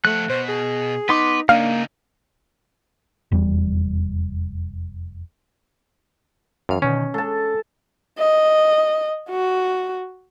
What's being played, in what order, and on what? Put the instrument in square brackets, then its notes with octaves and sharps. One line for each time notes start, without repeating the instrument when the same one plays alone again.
[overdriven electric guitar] F3 F#5 [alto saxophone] A3 [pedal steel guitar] F#6
[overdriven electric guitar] B2 [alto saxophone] C5
[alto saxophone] G#4
[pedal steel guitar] B3 C6 D6 [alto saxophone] D#4 [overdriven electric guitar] B4
[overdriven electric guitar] C#3 D#4 [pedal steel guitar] A#3 [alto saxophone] D4 [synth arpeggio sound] F5
[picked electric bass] F1 E2 G3
[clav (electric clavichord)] F#2 [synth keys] E3 F5
[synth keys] B2 D3 D#3 [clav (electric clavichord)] C#4
[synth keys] G#3 [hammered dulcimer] A4 A5
[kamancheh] D#5
F#4